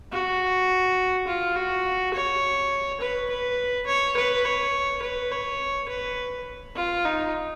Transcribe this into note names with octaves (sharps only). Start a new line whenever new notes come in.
F#4
F4
F#4
C#5
B4
B4
C#5
B4
C#5
B4
C#5
B4
F4
D#4